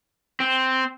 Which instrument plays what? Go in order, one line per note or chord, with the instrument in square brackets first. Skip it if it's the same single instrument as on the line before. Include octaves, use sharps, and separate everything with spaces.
[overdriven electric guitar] C4